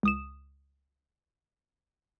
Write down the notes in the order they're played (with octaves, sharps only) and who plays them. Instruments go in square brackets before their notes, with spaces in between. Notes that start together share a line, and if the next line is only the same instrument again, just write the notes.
[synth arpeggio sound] C#2 D#6 E7